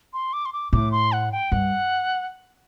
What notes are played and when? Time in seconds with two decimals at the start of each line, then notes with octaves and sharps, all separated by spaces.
0.13 C6
0.33 D6
0.45 C6
0.53 D6
0.73 A2 D6
0.92 C6
1.12 F#5
1.32 G5
1.52 G2 F#5